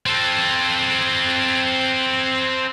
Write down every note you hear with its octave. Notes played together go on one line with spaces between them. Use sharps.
C4 A4